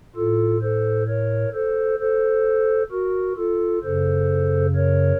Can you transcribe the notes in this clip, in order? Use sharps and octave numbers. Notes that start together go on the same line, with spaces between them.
A2 F4 A4
A4 C5
A#4 C#5
A4 C5
A4 C5
F#4 A#4
F4 A4
F#2 C#3 A4 C5
A#4 C#5